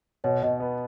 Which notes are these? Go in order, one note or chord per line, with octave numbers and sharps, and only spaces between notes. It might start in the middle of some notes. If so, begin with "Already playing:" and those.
B2 C#5
B2 D#5
B3